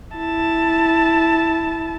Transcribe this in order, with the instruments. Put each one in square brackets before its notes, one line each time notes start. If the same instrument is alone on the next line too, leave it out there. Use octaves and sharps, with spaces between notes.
[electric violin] E4 A5